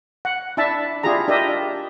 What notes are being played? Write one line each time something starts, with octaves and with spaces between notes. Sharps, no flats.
F#5
D4 E4 E5 A5
D4 E4 F4 G4 G#4 A#5
D4 G4 A#4 D#5 E5